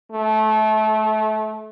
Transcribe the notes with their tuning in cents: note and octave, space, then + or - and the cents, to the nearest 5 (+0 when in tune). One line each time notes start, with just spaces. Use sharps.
A3 -25